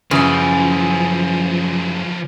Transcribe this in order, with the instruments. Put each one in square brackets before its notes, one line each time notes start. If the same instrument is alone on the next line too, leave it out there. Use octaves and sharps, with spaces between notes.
[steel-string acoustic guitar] F#2 E3 G#5 [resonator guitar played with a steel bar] C#3 [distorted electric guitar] F3 E4